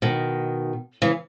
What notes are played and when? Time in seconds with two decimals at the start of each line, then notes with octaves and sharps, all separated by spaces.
0.02 B2 D#3
1.02 C#3 E3